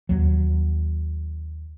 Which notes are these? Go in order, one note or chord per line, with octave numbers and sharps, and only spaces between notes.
D#2 F#3